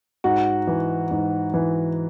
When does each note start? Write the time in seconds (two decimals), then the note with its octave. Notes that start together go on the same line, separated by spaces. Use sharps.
0.24 G#2 F#4
0.67 E3
1.11 G#2
1.54 E3